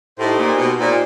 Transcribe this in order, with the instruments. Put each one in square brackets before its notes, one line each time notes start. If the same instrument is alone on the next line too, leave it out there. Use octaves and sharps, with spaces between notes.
[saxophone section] A2 [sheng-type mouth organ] D#4 G4 C5
[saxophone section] A#2
B2
[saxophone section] A#2 [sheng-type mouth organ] D#4 G4 C5